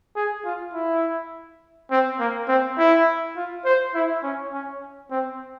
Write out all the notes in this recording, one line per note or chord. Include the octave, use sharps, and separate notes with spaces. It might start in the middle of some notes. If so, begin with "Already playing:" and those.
G#4
F4
E4
C4
A#3
C4
E4
F4
C5
E4
C#4
C#4
C4